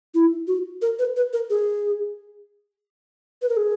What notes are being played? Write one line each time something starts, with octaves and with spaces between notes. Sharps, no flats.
E4
F#4
A#4
B4
B4
A#4
G#4
B4
A#4
G#4